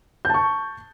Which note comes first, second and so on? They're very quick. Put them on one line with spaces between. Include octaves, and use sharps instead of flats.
G6 A5 C#6